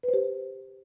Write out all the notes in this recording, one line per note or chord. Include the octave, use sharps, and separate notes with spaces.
B4
C5
G4